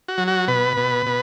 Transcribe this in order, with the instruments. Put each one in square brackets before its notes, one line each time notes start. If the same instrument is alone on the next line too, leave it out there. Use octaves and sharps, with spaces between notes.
[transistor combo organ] F#4
F#3
F#4
B2 B4
B2
B2